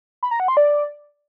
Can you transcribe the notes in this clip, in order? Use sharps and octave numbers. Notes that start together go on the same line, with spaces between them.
B5
A#5
F#5
C6
D5